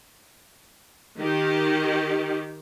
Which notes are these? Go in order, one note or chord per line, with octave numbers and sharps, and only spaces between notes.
D#3 G4